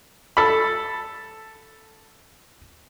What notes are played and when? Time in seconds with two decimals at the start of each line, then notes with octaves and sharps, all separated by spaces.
0.37 A4 B5